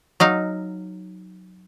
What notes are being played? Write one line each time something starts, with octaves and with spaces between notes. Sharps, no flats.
F#3 D#4 F5